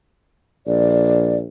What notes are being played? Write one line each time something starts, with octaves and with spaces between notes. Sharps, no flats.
A#1 D5